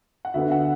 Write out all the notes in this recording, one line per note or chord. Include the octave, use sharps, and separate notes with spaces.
F#5
D2 D3 B3 E5
F#5